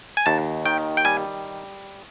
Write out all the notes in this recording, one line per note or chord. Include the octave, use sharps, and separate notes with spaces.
G#5
D#2 A5
D#3 G5
G5
G3 G#5